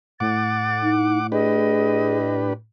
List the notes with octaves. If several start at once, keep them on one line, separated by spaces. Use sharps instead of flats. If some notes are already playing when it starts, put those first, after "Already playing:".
A2 F#5 D6 A6
D#4
D4 G4 G#4 B4 D#5